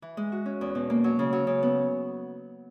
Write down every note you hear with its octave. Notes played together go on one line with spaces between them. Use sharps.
E3
G#3
F#4
C#4
E2
B2
A#3
F#3
C#3
F#3
C#3
B3